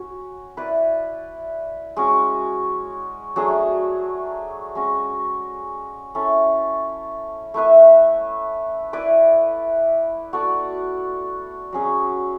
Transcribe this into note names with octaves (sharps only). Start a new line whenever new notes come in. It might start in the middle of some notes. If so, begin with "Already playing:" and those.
Already playing: C#4 F#4
E4 B4 D5
G#3 C#4 F#4
F#3 A3 D4 G#4
G#3 C#4 F#4
C#4 E4 A4
A3 E4 B4 E5
E4 B4 D5
B3 F#4 A4 D5
F#3 C#4 G#4